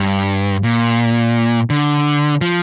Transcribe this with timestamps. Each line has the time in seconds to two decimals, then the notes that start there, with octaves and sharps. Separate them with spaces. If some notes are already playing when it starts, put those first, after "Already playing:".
Already playing: G2
0.63 A#2
1.70 D3
2.41 F3